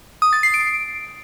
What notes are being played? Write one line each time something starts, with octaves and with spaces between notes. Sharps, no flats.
D#6
A6
C7
D7